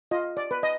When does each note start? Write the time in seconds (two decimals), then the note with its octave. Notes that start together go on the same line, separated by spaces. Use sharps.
0.11 F4 D#5
0.37 D5
0.51 B4
0.63 D#5